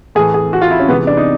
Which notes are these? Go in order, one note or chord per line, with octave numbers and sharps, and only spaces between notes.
A2 E3 A3 G#4
G#4
F#4
F4
E4
C#4
C3 E3 G#3 B3
D4
D#4